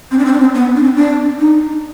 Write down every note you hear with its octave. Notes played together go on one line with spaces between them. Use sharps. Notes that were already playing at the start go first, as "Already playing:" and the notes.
C4
D4
C4
D4
C4
B3
D4
C4
D4
D#4